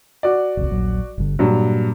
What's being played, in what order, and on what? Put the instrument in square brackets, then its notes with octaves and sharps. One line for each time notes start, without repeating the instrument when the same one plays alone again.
[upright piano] F#4 D5
[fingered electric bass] E1 C2
D#1 A#1 F#3
G1 G2 D3
[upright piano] G2 F#3 [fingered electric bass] A#2